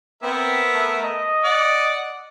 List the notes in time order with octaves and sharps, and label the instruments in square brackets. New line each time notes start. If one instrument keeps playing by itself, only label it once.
[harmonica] B3 A#4 E5 [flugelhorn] C4
[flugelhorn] A3
D#5
[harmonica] D5 F#5